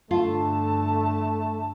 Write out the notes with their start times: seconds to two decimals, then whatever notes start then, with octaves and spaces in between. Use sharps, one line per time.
0.11 G2 D3 A3 F4 A5